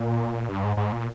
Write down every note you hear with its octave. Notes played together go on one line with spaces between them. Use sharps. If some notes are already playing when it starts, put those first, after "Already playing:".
Already playing: A#2
G2
G#2
G#2
A#2